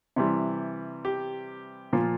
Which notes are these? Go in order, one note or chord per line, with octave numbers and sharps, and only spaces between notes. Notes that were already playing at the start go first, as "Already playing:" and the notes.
C3 E3 G3
G4
A#2 F3 F4